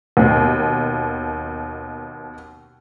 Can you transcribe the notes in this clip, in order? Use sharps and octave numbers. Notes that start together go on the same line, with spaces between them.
D#2 B2